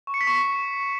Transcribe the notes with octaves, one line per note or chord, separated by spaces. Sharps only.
C#6
C#7
B6
C#6